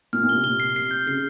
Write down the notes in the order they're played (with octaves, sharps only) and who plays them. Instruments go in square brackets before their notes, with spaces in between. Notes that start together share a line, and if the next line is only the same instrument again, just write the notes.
[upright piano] A#2 [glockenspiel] F6
[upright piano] A#2
[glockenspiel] G7
[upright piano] C3
[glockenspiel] G7
C7
C7
G6
[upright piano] C#3 [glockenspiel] C7